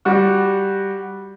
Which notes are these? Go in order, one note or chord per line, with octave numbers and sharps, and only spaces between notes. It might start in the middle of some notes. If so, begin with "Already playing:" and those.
G3 F#4